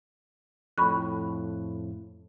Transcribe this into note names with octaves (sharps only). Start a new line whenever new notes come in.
F2 A2 B5 C#6 F#6